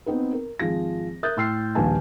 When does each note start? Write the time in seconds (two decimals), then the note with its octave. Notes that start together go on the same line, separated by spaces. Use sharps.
0.06 B3 C4 D#4 B4
0.33 A#4
0.59 G#1 F3 G#4 A#6
1.23 A#4 E5 D#6 F#6 G6 A6
1.37 A2 G5 C6 E6 F6 C7
1.75 D#1 A#1 D#2 B4 G#5 A5